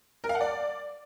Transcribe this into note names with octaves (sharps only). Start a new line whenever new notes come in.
A#4
F5
F#5
D5